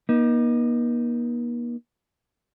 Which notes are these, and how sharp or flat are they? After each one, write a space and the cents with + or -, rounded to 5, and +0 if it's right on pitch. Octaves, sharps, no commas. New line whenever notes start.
A#3 +45 D#4 +0